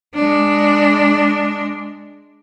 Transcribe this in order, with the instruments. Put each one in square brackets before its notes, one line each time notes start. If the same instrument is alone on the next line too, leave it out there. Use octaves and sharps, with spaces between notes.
[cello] G#3 D4